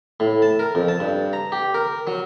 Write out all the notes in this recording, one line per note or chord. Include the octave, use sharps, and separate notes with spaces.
A2
A5
A#4
F2
A5
G2
A#5
G4
A#4
F#3